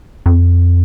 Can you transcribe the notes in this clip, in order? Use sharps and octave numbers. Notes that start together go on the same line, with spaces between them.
F2